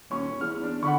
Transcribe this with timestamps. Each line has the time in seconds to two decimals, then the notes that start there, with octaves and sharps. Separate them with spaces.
0.11 D#1 C#4 C#6
0.41 E2 F6
0.63 D4
0.83 D3 F#5 B5 C#6